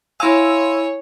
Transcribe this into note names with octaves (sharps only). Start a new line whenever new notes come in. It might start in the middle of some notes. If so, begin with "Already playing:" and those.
E4 C#5 F5 G#5 C6 E6